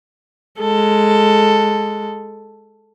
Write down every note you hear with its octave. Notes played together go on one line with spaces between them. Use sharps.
G#3 A4